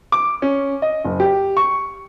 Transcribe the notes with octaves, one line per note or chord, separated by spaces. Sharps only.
D6
C#4
D#5
F#1
G4
C#6